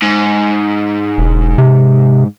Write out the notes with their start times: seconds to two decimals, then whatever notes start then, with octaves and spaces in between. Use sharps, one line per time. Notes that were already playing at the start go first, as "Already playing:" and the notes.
0.02 G#2
1.18 E1
1.58 C3